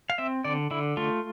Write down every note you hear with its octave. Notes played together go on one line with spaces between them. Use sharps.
F5
C4 E5
D3 D5
D3 E4
A3 F4